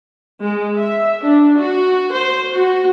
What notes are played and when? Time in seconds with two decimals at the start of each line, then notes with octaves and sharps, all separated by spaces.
0.41 G#3
0.78 E5
1.22 D4
1.58 F#4
2.12 C5
2.54 F#4